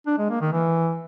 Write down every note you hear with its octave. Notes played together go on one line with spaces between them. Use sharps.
D4
G#3
A#3
D#3
E3